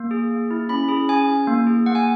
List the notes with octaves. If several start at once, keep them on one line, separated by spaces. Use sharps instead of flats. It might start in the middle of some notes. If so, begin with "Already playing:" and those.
Already playing: A#3
G#4
A#3
E4
C#4 B5
G#4
C#4 G#5
E4
A#3
G#4
A#3 F#5
G#5